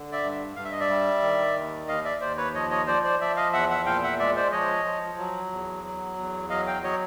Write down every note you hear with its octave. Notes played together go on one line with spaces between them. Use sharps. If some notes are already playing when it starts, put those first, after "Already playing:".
Already playing: D3
D5 E5
G2
G2 F5
E5
D#5
D5 E5
G3
D#3
D#2
D#2 D#5 F5
D5 E5
D#2 C5 D5
B4 C#5
F3 C#5 D#5
C#5 D#5
F3 C5 D5
C5 D5
F3 D5 E5
D#5 F5
E2 E5 F#5
E5 F#5
A#2 F5 G5
E5 F#5
G#3 D5 E5
C5 D5
F3 C#5 D#5
F3
F#3
E2
F#3
E2
F#3 D#5 F5
F5 G5
F#3 C#5 D#5